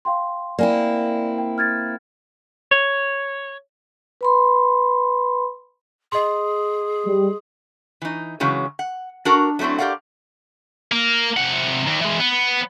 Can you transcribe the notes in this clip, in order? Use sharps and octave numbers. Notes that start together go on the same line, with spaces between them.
F5 G5 C6
A#3 C4 E4 D5 G#5
G5
F6 G#6 A6
C#5
B4 B5 C6
G#4 D#5 C6
G3
E3 D#4
C#3 E3 F#3 G#3 C#4
F#5
D4 F#4 A#4 F#5
F#3 A3 C4 D4 E4
G4 A#4 D5 F5 F#5
A#3
C3 F#5
D#2
E3 G#3
B3